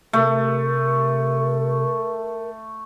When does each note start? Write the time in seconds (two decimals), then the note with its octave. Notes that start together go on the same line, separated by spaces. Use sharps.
0.13 C3 A3 A#4